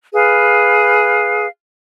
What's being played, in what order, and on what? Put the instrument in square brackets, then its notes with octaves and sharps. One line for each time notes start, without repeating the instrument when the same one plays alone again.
[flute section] G#4 B4 F5